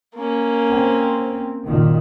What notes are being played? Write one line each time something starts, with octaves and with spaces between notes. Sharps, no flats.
A#3 C#4
C4
F#1 A#2 D#3